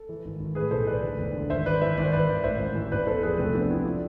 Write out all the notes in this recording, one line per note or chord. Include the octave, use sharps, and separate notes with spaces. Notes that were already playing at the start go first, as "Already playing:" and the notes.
Already playing: A4
E3
G#1
G#1
A2 G#4 B4
B1 A4 C5
E3 B4 D5
D2
E1
D3
G#1 C5 E5
G#1 B4 D5
E3 C5 E5
G#1 D5
C5
G#1 B4 D5
G#1
A1 C5 E5
A1
E3
E1 B4 D5
E2 A4 C5
F3 G#4 B4
C2 A3 C4
F3 B3 D4
C3 C4 E4
D4 F4